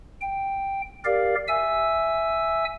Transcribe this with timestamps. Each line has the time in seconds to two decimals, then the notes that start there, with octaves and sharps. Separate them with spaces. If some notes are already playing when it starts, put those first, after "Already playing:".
0.21 G5
1.05 G4 A#4 D5 F5
1.48 E5 G#5 E6